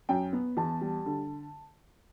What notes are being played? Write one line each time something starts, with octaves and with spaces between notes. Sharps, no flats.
F#2 G5
B3
E2 A5
G3
D3